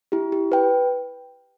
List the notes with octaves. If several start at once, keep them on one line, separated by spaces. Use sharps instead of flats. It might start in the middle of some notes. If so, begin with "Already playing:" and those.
E4 G4
G4
B4 G5